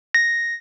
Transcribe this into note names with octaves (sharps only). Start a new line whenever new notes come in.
A#6